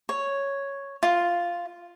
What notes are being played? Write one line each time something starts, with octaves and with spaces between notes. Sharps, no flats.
C#5
F4